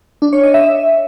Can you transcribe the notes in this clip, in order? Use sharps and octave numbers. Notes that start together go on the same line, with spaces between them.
D4
C#5
D#5
E5